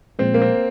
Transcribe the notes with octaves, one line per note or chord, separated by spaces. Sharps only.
A#2 F3 G#3 C4
A#3
C4